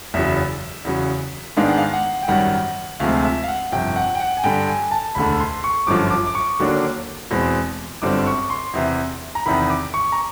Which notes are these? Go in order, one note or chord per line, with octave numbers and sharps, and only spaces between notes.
F#1 E2 C#3 F#3 E5
E2 C#3 F#3
G#2 D#3 G#3 B3 D4 F5
F#5
F5
F#5
G5
G#1 F#2 D#3 G3 F#5
D2 C3 F3 G#3 C4 F5
E5
F5
F#5
G1 F2 C3 G5
F#5
G5
F#5
G#5
G2 D3 G3 G5
G#5
A5
E1 D2 D3 B5
C6
C#6
G1 F#2 D3 F3 D6
D6
D6
C#6
D#2 D3 F#3 A#3 D4
E2 B2 G#3 C4
G1 F#2 D3 G3 C4 D6
C#6
C6
E2 C3 E3
A#5
E2 C3 D#3 B5
D6
C#6
A#5